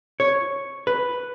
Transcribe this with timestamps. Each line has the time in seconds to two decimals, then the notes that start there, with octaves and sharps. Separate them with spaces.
0.20 C#5
0.87 B4